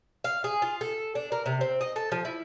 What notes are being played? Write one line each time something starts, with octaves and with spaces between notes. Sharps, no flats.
F5
G#4
F4
A4
D4
A#4
C3
C4
D#5
A4
F3
E4